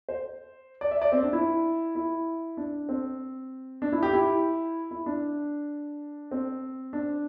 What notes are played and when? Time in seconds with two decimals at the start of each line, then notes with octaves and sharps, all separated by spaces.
0.09 C5
0.81 D5
0.91 E5
1.02 D5
1.12 C4
1.23 D4
1.33 E4
1.95 E4
2.57 D4
2.89 C4
3.82 D4
3.92 E4
4.03 G4
4.13 E4
4.91 E4
5.06 D4
6.31 C4
6.93 D4